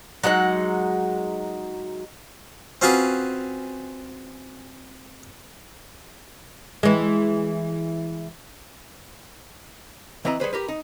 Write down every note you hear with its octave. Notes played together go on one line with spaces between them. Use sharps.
F#3 G#3 D#4 F#5
C4 C#4 F4 F#4 G#4 B4
E3 G#3
E3 C4 B4 D#5 A#5
G3 G#4 B4 C5
G4 A#4 B4
D#4